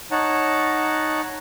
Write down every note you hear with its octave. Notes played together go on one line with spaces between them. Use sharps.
D#4 C#5 F#5 A5 A#5